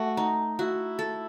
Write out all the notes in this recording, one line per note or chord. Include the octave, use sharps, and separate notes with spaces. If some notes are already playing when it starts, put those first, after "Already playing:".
Already playing: A3 F#4
D#4
E4 F#4
A4